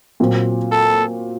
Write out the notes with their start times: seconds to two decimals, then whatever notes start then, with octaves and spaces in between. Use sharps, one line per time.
0.20 A#2 F#3 C4
0.72 A4